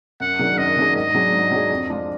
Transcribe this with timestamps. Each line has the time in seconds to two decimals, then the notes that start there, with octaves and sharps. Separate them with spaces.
0.20 F#2 F#5
0.39 D#3 F#3 D4 G#4
0.58 F#2 D#5
0.77 D#3 F#3 D4 G#4
0.95 G#2 D#5
1.14 F#3 D4 G#4
1.32 G#2
1.52 F#3 D4 G#4
1.70 F2
1.89 F3 G#3 D4 F4